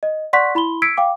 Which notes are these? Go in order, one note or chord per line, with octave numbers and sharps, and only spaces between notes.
D#5
D5 F#5 C6 C#6 F#6 B6
E4 B5 C6 G7
E6 G#6 B6 C#7 D7
F5 G5 D6